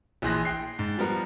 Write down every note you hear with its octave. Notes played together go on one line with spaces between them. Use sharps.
A#1 E3 G#4 C6 F#6 A#6
G5 C7
G#2
F3 G3 B3 A#4